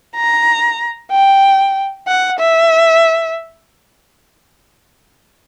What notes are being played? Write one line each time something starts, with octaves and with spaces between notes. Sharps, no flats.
A#5
G5
F#5
E5